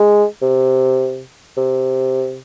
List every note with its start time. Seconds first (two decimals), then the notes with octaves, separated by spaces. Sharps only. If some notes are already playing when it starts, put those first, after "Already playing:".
Already playing: G#3
0.42 C3
1.57 C3